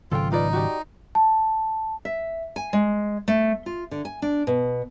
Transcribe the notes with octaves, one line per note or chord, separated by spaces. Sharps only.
G#1 C#3 F3 F4 A4 G5
D#4 F4 B4 D5
F#4 G4 D5
A5
E5
G#5
G#3
A3
F4
D3
G#5
D4
B2